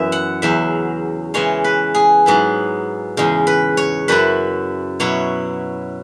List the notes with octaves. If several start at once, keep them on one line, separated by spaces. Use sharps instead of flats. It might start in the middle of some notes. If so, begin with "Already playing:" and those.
Already playing: F#2 E3 B3 E5
F#5
E2 C#3 F#3 E5
C#3 E3 G#3 C#5
B4
G#4
G#2 F#3 B3 E4
E2 C#3 G#3
B4
C#5
F#2 F#3 E4 B4
B2 F#3 E4 C#5